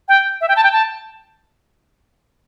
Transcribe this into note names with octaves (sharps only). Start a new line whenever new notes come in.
G5
E5
G5
A5
G5
A5